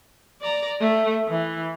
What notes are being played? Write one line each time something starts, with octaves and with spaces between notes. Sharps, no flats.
D5 A#5
A3
E3